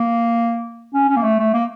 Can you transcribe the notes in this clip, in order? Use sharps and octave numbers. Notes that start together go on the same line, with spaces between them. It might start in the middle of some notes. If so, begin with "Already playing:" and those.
Already playing: A#3
C#4
C#4
A#3
A3
A3
A#3